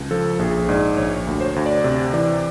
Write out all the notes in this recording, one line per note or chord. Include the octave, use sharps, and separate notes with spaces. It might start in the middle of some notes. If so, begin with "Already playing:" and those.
Already playing: C#2
F3 A4
A#1 G#4
G#2 D5
A#1 C#5
D2
C5
C#5
D2
D5
C3
E3 D5